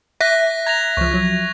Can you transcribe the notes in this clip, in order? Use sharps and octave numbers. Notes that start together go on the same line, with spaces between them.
E5 F#6 A#6 B6
A#5 G#6 A#6 F7
C#2 F3 C#6
F3 F#3